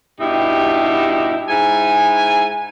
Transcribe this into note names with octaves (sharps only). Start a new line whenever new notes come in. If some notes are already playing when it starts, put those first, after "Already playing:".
G2 B2 D#4 E4 G4
G#2 E4 G#5